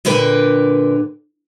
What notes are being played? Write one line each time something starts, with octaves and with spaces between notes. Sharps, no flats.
A#2 D3 A#4 B4 G5